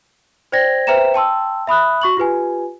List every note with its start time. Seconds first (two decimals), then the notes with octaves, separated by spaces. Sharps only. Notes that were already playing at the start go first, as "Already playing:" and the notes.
0.52 C5 D5 G5 G#6 A#6
0.87 B4 C5 E5 G5 A#5 E7
1.14 G5 A5 C6 E6
1.67 E5 B5 D#6 F#6
2.02 F#4 C#6 F#7
2.17 F4 G4 B4 G#5